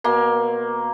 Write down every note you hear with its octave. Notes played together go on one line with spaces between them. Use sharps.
B2 A#3 C6